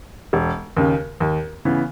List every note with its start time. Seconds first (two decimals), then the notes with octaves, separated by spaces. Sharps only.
0.33 E1
0.77 D#2 C#3
1.20 D#2
1.65 C#3 E3 B3